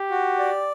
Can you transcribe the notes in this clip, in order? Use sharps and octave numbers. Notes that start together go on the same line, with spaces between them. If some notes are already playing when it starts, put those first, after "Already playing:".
Already playing: G4
F#4
D5